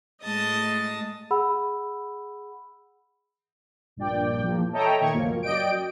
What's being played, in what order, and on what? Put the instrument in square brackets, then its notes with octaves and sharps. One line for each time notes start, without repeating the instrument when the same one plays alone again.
[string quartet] A2 G#3 D#5 A5 D#6
[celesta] G#4 F#5 B5 E6
[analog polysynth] A#1 G2 A#2 D5 G5
E2 F3 A#3
A4 C#5 D#5 E5 G5 A#5
A#2 D#3 C#6 G#6
C#2 F#2 F3 A#3
F#2 D5 D#5 G5 D7